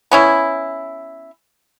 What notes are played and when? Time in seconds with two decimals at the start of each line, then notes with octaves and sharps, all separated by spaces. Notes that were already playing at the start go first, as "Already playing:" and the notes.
0.11 B3 C#4 E4